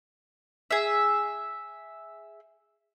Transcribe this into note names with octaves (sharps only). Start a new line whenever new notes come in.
G#4 E5